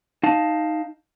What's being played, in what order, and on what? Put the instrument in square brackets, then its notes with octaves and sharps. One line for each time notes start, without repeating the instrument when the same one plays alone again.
[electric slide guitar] D#4 F5 A5